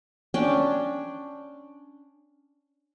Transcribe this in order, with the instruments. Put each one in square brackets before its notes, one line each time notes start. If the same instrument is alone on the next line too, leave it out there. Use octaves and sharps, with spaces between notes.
[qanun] C#4 D4 G5